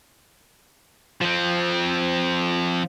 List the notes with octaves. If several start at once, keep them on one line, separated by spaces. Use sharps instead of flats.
F3 C4